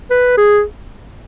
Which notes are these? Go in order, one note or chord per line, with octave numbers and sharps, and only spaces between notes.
B4
G#4